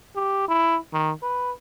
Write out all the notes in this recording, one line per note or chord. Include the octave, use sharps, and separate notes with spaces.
G4
E4
D#3
B4